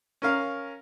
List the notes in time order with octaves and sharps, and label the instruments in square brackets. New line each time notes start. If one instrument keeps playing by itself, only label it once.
[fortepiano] C#4 A#4 F5